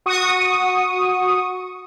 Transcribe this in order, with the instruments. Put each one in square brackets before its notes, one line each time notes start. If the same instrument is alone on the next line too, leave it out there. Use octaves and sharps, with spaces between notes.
[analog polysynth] F#4 C#6 D#6